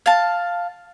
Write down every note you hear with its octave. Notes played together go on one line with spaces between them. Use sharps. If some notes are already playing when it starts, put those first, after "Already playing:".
F5 A5